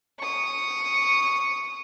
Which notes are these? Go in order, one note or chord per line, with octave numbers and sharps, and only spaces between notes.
C#6 D#6